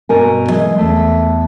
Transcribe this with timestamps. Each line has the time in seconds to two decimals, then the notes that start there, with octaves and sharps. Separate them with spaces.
0.09 G2 B2 A#4 G#5
0.49 E3 G#3
0.78 E2 A3